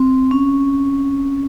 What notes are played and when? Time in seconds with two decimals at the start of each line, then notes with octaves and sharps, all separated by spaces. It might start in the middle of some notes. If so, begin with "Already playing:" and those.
Already playing: C4
0.31 C#4